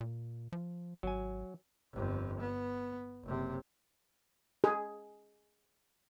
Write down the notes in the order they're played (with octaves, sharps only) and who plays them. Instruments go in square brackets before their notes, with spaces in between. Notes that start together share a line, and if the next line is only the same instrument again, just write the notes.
[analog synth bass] A#2
F3
[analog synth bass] G#1 [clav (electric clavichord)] F#3 G#5
[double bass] G1 F2
B3
F#1 C3
[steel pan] G#4